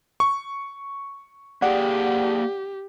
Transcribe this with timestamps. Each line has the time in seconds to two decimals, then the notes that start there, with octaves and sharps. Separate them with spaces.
0.20 C#6
1.62 A#3 G4 G#4 D5 F#5 G5